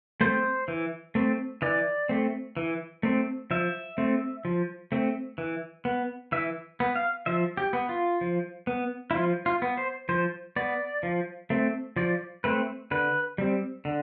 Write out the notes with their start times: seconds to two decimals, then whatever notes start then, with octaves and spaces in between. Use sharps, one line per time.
0.21 A3 C4 C5
0.68 E3
1.15 A3 C4
1.62 E3 D5
2.09 A3 C4
2.57 E3
3.03 A3 C4
3.51 F3 E5
3.98 A3 C4
4.45 F3
4.92 A3 C4
5.38 E3
5.85 B3
6.32 E3 E5
6.80 B3
6.96 F5
7.26 F3 E5
7.57 G4
7.73 B3
7.89 F4
8.21 F3
8.67 B3
9.11 E4
9.15 F3 F4
9.46 F4
9.62 B3
9.78 C5
10.09 F3 C5
10.56 B3 D5
11.03 F3
11.50 A3 C4
11.96 F3 D5
12.44 A3 C4 B4
12.91 D3 B4
13.38 G3 C4
13.85 D3